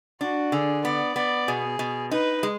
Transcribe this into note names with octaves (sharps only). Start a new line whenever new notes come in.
D4 F#4
D3 G#4
B3 D5
B3 D5
B2 G#4
B2
D#4 B4
G#3